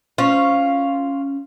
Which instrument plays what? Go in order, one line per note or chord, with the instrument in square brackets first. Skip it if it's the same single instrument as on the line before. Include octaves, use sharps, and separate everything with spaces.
[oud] C#4 C5 [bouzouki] F4